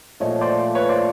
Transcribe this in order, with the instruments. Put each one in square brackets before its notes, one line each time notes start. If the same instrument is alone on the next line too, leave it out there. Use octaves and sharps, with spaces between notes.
[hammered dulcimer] A#2 F3 A3 [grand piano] C#5 D#5
[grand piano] C5 D5
B4 C#5
C5 D5